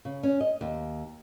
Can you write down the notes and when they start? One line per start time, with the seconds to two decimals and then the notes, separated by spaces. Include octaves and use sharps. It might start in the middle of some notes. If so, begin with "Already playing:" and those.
0.05 C#3
0.23 C#4
0.41 D#5
0.61 D#2